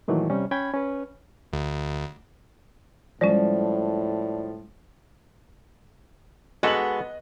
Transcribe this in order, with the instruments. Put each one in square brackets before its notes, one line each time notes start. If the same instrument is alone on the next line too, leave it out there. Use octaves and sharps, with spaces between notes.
[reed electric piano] A#2 D#3 E3 F#3 A3
C3 G3 C#4
C#4 G5 B5 G#6
C#4 B4
[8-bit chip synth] D2
[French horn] A2 [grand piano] F3 [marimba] G3 G#3 C#4 [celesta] D5
[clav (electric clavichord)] G#3 F#4 A4 [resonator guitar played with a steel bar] B3 [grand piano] D#5 F#7